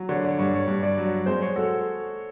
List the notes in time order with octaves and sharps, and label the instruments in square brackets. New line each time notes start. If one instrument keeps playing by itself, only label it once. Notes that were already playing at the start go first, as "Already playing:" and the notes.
Already playing: [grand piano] F#3
[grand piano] D3 [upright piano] C#5
[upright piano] D5
[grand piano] G2 [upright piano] C#5
[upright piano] C#5
[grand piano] G2
[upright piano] D5
[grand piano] F#3
[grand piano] G#3 [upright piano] C5
[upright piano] C#5
[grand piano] F#4 [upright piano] A4